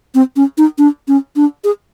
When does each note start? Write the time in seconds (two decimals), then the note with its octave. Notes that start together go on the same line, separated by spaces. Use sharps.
0.15 C4
0.36 C#4
0.58 D#4
0.78 D4
1.08 C#4
1.36 D4
1.64 G#4